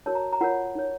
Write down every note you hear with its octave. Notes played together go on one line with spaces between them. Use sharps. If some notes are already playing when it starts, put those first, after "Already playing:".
F#4 A#4 C#5 A5
A#5
A#5
F4 A#4 C#5 F#5
D#4 A#4 C#5